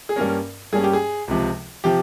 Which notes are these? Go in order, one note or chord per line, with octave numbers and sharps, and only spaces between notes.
G#4
G2 G3 A#3 C#4 A#4
G2 G3 A#3 C#4 G#4
G4
G#4
C#2 C3 F3
C3 F3 G4